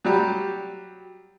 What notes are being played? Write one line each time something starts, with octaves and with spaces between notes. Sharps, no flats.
F#3 G3 G4